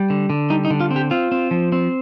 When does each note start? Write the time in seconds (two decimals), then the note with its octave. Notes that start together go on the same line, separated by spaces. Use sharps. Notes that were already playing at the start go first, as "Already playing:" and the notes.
Already playing: G3
0.10 D3
0.30 D3
0.50 G3 D#4
0.65 D#4
0.71 D3
0.81 F4
0.91 C4
0.96 G4
1.11 C4 F4
1.32 C4
1.51 F3
1.72 C4